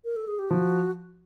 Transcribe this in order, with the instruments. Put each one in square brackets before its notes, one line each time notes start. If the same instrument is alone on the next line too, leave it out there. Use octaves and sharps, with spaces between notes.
[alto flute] A#4
A4
G#4
G4
[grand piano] F3 [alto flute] F#4